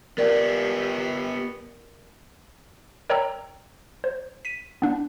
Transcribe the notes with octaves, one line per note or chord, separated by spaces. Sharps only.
B3 G4 A#4 D5
A#4 C#5 D5 G5 A#5 E6
C5
B6 D#7
B3 D4